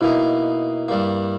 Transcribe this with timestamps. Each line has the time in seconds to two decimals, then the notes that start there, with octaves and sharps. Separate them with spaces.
0.01 B2 A#3 D#4 E4
0.88 G2 G3 A#3